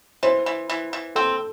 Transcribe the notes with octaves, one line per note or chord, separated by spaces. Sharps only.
E3 C5
E3
E3
E3
C4 A4